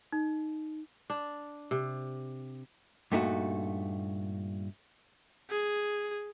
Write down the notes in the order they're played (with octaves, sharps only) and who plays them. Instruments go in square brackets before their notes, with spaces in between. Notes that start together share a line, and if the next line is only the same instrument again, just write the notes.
[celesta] D#4
[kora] D4
C3
[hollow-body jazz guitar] G2 A#2 A3 D#4 E4 F#4
[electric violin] G#4